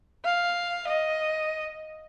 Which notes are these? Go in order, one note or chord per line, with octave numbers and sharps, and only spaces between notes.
F5
D#5